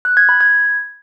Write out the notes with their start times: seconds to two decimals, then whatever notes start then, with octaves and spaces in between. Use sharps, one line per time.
0.05 F#6
0.17 G#6
0.29 B5
0.41 G#6